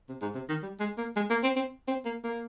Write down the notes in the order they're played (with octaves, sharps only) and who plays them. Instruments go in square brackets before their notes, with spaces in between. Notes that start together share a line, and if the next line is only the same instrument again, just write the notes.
[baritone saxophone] C3
G#2
C3
D#3
G3
G#3
A#3
G#3
A#3
C4
C4
C4
A#3
A#3